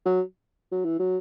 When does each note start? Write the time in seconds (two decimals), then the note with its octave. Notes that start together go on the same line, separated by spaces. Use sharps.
0.06 F#3
0.72 F#3
0.85 E3
0.99 F#3